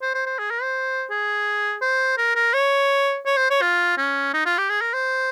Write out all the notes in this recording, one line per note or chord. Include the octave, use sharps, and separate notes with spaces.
C5
C5
C5
G#4
A#4
C5
G#4
C5
A#4
A#4
C#5
C#5
C5
C#5
F4
C#4
D#4
F4
G4
G#4
A#4
C5